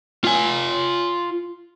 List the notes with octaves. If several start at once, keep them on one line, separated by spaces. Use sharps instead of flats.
F4 G#5